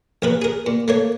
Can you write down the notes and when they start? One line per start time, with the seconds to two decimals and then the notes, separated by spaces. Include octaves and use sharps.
0.22 A#1 A#4 B4
0.42 G#4 A#4
0.66 A#2
0.88 A3 A#3 C#5